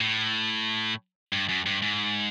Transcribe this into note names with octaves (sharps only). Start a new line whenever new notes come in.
A2
G2
F#2
G2
G#2